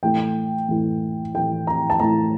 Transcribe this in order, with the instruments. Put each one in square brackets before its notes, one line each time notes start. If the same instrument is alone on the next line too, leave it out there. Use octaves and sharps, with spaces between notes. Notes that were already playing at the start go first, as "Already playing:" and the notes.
[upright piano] A2 E3 A3 G5
A2 E3 A3
A2 E3 A3 G5
A#5
A5
A2 E3 A3 A#5